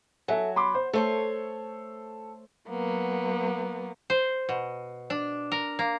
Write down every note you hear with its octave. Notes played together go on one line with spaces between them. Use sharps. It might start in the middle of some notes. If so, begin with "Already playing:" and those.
F#3 A4 E5 G#5
B5 C6 D6
C5
A3 A4 C5 C#5
F#3 A#3 B3
C5
B2
D4
A#4
A#3